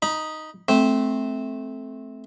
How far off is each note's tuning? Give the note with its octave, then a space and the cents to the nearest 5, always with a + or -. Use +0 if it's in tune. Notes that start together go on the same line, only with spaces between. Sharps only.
D#4 +0 B5 -25
A3 -15 C4 +0